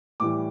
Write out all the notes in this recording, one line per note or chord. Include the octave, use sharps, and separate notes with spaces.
A2 E3 G3 D6